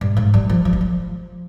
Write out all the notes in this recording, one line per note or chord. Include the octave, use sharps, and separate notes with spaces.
G2
G#2
G3
F3
F3
G3
F3